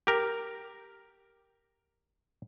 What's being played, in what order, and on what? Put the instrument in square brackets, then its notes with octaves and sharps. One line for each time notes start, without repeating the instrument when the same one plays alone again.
[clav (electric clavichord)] G4 A#4